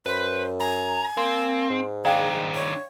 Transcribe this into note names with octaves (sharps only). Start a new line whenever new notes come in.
F#2 B4 C5
G#5 A#5
A#3 C4
G#2
D#3 D4 G#4 D5 F5 G5
C#5